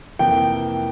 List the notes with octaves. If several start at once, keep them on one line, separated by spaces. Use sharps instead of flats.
F2 C3 E3 A#3 G5